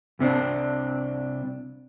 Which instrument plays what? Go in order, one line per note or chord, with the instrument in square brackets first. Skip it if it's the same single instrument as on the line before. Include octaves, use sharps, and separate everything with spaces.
[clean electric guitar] C2 C3 C4 D4